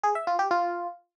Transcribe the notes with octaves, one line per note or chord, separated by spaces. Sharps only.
G#4
E5
F4
G4
F4